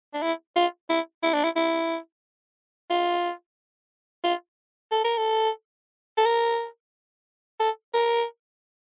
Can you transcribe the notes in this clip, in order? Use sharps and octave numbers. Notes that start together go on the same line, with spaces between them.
D4
E4
F4
E4
E4
D4
E4
E4
F4
F4
A4
A#4
A4
A4
A#4
A4
A#4